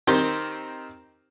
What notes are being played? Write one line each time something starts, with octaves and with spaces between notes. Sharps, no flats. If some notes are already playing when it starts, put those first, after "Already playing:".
D#3 C4 D#4 G4 A#4 C5